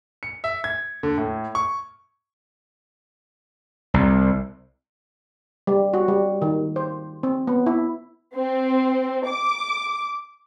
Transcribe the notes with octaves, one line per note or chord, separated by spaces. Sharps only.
C#7
E5
G#6
D3
A2
C#6
C2
G3
F#4
G3
D#3
C5
C4
B3
E4
C4
D6